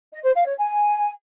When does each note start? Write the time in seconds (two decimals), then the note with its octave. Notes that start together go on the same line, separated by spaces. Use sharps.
0.12 D#5
0.23 C5
0.35 F5
0.46 C#5
0.57 G#5